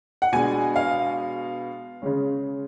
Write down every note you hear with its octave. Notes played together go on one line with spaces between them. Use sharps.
F#5
B2 G#3 D4 G#5
F5
C#3 G#3 C#4